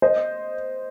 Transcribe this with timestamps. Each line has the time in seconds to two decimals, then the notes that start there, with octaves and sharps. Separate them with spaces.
0.02 C5 D#5